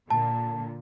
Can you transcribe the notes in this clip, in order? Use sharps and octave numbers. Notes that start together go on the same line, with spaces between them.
A#2 D3 A5